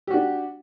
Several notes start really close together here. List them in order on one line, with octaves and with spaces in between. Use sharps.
G4 F#4 D4